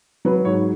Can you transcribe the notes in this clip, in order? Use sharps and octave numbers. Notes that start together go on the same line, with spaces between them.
F#3 B4
G#2 C#5